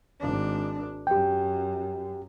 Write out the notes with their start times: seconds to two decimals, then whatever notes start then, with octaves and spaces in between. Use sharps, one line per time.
0.20 G#1 D4
1.07 F#2 G4 G5